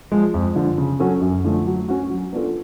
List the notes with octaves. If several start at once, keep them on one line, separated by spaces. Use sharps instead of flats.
F3 G#3
F2
D3 F3
C#3
F#3 C#4 F#4 A4
F#2
D3 F3 A3
F#3
C#4 F#4
F#3
B3 D4 F4 A4